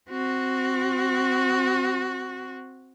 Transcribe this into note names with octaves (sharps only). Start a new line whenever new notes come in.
C4 F#4